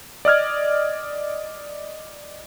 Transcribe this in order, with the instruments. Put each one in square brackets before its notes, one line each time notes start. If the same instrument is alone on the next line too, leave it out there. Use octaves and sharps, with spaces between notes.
[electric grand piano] D5 D#5 F6 G#6